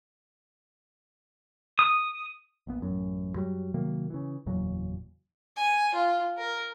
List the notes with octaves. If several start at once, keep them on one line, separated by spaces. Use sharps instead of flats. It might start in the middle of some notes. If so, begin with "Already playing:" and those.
D#6
A#1 A#2 B3
A1 F#2
F#2 F#3 G3
C3 D#3 F#3 A#3
C#3 E3
F#1 E2 A#2 F#3
G#5
F4
A#4